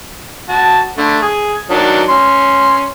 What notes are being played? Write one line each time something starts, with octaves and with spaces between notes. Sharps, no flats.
F#4 A5
D3 A3
G#4
D#3 F#3 D4
C#4 C6